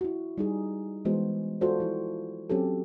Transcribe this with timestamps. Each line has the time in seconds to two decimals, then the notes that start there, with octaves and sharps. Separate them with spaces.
0.01 E4 F#4
0.38 G3 D#4 G#4
1.05 E3 G#3 B3 F#4 C5
1.61 F4 F#4 A4 C5 D5
1.80 F3 E4
2.50 F#3 C4 C#4 G4 A4